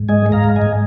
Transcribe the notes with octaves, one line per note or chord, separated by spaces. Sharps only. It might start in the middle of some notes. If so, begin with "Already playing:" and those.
Already playing: G#2
G#3 D#5 G#5
G#3
F5 A#5
G#2
D#5 G#5
G#2